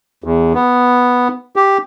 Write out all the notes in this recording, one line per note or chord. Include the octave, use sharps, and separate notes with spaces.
E2
B3
G4